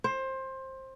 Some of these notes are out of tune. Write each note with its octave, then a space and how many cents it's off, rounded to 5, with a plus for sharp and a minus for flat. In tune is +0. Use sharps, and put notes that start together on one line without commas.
C5 +20